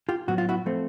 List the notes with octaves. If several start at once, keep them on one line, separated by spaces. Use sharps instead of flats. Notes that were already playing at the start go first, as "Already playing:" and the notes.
F4 G4
A2 F#3 B3 F#4
F4
E4 F#4
F3 A3 C4